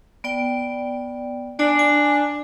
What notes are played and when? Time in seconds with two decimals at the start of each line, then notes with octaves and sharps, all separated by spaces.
0.24 B3 D5 G5
1.59 D4 D5 G#5
1.79 G#5